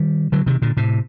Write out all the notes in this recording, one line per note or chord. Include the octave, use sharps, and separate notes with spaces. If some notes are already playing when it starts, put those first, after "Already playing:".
Already playing: D#3 G3
D3 F#3
C3 D#3
A#2 D3
A2 C3